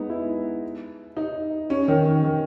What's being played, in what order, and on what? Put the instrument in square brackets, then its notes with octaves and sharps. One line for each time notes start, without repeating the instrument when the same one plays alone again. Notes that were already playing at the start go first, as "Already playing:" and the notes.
Already playing: [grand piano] G#3 B3 D#4
E4
D#4
C#4
D#3
D#3
D#3